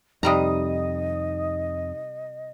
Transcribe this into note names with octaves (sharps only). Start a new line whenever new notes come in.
F2 C3 G3 D#4 D#5 A#5 D#6